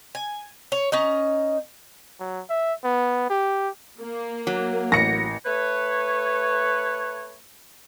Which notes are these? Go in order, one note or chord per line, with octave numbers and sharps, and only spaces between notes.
G#5
C#5
C#4 D#4 D#5
F#3
E5
B3
G4
A#3
F#3
A1 A#6 C#7
A3 B4 C#5